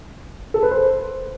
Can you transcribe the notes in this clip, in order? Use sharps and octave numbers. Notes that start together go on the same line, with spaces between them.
A4
B4
C5